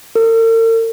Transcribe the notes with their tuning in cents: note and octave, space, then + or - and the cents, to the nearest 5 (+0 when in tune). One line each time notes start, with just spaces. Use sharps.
A#4 -45